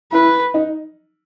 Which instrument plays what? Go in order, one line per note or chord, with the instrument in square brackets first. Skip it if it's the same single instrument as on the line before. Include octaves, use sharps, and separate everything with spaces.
[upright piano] E4 [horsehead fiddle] B4
[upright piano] D#4